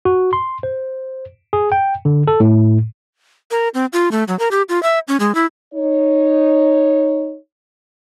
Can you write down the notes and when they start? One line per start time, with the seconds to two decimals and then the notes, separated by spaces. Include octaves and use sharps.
0.05 F#4
0.33 C6
0.63 C5
1.53 G#4
1.72 G5
2.05 D3
2.28 A4
2.40 A2
3.51 A#4
3.74 C4
3.93 F4
4.12 A3
4.28 F#3
4.39 A#4
4.51 G4
4.69 F4
4.83 E5
5.08 C#4
5.20 G#3
5.35 E4
5.74 D#4 C#5